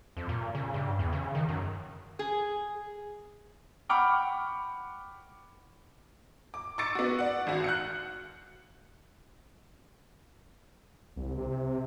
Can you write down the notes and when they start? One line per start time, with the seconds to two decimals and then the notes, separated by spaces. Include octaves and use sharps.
0.17 F2
0.29 A#2
0.55 C#3
0.74 G2
0.99 E2
1.13 C#3
1.35 D#3
1.49 F#2
2.19 G#4
3.89 F#5 G5 B5 C#6 D6 F6
6.54 D6
6.78 C#6 D6 E6 A6 C#7 D7
6.95 B3 F#4
7.19 D5 F#5
7.47 G#1 F#4
7.64 F#6 G6 C#7
11.16 C2
11.38 C3